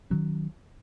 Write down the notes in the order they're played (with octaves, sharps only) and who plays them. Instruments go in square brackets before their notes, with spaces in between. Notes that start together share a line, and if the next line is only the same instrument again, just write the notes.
[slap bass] D#3 F#3 C#4